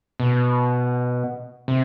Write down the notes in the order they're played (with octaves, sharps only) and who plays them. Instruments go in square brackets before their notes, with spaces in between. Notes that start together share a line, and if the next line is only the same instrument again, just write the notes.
[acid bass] B2
C3